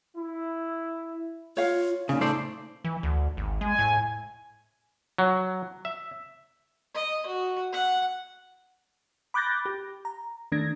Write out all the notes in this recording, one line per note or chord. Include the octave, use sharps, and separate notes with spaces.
E4
F4 C#5 F5
A#2 C#3 D#4
A3 D#4 C5 D5
E3
D2
G#1
G#3 G#5
A2
F#3
E5
D#5
F#4
F#5
B5 D6 F#6 G6 A6 A#6
G4
A#5
D#3 A3 D4 G#6 A#6